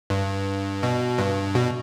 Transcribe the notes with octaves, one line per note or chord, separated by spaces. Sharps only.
G2
B2
G2
B2